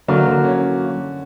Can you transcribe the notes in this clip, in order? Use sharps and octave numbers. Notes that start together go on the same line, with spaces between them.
D3 F#3 A#3
D3
C#4